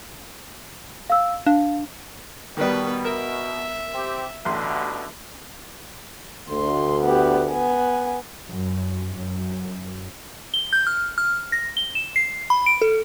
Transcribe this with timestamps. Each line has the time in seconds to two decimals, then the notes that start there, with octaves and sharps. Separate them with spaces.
1.10 F5 E6
1.47 D4 F5
2.57 B2 D#3 G3 B3 B4
3.05 A#4 E5
3.94 C4 G4
4.45 A1 B2 D3 C6
6.49 D2 C6
7.03 B3 G4
7.49 B3 G#5
8.50 F#2
9.15 F#2
10.54 G7
10.73 G6
10.87 F6
11.18 F6
11.52 A#6
11.77 G7
11.95 E7
12.16 C7
12.50 B5
12.66 D7
12.82 A4